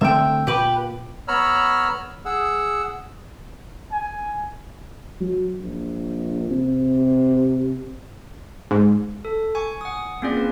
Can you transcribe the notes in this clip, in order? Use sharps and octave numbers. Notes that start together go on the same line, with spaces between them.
D3 A3 C4 E5 G5
A#2 G4 B4
B3 C#5 A#5 B5 E6 F6
G#4 F#5 E6
G#5
F#3
A#1
C3
G#2
A4
G#5 C#6
F#5 D#6
A#3 C4 C#4 F4 G#4 D5
B4